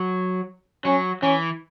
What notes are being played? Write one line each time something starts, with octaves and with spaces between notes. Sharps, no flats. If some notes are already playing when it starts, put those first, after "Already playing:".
Already playing: F#3
F#3 C#4
E3 C#4